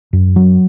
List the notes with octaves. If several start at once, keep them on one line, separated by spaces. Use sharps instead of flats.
F#2
F#3